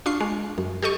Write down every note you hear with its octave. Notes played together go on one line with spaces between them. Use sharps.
D4 F4 C#6 C7
G#3
F#2
G4 A4 D#5 C#6